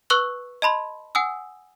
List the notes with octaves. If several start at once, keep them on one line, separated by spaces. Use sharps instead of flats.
B4 C#6 E6 F#6 F#7 G7
D#5 A5 B5 C6
F#5 G#5 D#6 E6